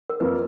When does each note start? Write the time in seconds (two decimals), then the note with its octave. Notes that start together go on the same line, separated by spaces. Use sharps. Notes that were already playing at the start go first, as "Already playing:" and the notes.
0.10 A#4
0.20 F2 F3 A#3 F4 B4